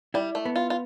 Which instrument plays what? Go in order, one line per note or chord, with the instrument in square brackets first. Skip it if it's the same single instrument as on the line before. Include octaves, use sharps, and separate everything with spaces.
[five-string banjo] G3 [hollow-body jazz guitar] E4
[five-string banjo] A3
[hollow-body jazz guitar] B3
[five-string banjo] F4
F4